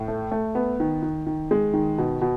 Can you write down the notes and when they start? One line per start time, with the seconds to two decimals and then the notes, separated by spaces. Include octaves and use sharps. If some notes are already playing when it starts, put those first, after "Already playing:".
Already playing: A2
0.08 A3
0.32 A3
0.55 B3
0.80 D#3
1.02 D#3
1.26 D#3
1.51 G#3
1.73 D#3
1.98 B2
2.21 B2